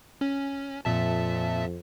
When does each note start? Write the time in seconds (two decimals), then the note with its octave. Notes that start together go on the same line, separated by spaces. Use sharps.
0.21 C#4
0.85 F2 A#2 E5 A5